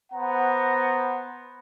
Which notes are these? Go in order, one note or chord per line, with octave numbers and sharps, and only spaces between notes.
B3 C5 F#5 A#5